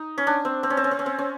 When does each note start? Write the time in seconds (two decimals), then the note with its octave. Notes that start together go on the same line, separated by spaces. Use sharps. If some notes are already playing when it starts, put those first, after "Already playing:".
Already playing: D#4
0.18 C#4
0.27 D4
0.45 C4
0.63 C4
0.70 C#4
0.77 C4
0.84 C#4
0.91 C4
0.99 C#4
1.06 C4
1.19 C#4